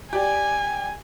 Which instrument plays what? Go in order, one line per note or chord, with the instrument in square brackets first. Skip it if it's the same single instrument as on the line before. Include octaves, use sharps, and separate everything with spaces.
[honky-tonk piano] G4 D5 [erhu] G#5